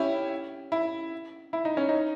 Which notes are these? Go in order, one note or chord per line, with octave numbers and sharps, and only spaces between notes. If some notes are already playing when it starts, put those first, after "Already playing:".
Already playing: C#4 E4 G4
E4
E4
D#4
C#4
D#4